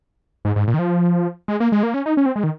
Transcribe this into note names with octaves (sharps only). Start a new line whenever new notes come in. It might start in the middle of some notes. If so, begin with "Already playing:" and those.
G#2
G#2
A#2
D#3
F3
G#3
A#3
G#3
A#3
C#4
D#4
C#4
C4
G#3
D#3